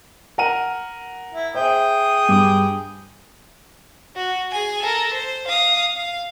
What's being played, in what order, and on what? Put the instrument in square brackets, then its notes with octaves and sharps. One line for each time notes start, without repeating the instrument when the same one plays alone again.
[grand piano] A#4 F#5 D#7
[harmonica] E4
[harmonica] G#4 G5 D#6 [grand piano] C5 E5
[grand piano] G2 D6
[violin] F#4
G#4 G#5
A4 A#4
C5
F5 D#6
F5